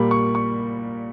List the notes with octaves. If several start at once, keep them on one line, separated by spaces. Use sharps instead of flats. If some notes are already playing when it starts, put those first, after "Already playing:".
Already playing: A#2 G3 A#3 B5
C#6
C#6